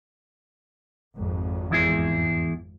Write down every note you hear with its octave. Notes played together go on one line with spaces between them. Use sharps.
G#1 F2
E2 E4 G#4